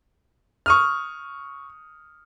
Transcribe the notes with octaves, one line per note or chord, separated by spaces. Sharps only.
C#6 D#6 F6